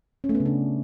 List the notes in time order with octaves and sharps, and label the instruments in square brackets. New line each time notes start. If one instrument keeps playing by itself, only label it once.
[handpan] C#4
A3
B3
C#3
D4